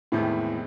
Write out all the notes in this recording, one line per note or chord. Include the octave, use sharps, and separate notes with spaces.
E2 A2 C3 D#3 G#3 B3